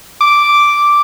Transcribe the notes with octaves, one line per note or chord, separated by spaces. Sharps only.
D6